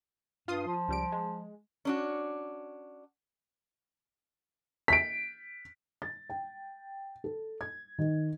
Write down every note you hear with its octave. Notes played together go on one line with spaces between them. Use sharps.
G2 F4 C6 D#6
F3
C#2 G3 D7
G#3
C#4 D4 F#4
B6 D7
A6
G5
A4
G#6
D#3